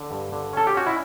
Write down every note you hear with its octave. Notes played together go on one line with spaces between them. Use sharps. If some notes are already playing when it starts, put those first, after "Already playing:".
Already playing: D3
G2
D3
C#4 A4
G4
C#4 F#4
E4